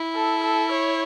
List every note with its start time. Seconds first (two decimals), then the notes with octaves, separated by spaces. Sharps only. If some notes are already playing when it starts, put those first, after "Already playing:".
Already playing: E4
0.16 A4
0.44 A4
0.72 C#5